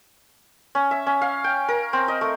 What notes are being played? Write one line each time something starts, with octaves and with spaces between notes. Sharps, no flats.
C#4
E5
C#4
F5
G5
A#4
C4
D#5
A3